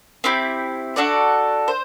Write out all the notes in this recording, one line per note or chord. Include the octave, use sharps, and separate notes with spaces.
C4 E4 G4
D4 F#4 A4 D5
C5